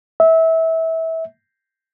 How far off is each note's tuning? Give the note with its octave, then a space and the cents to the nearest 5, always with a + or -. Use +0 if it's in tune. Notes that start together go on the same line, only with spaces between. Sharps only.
E5 -25